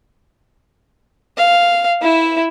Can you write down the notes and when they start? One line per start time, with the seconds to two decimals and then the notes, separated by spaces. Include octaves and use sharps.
1.37 F5
2.02 E4 E5